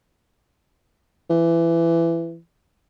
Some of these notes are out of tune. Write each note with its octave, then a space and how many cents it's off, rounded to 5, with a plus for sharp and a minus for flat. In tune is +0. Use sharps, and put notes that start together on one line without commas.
E3 +20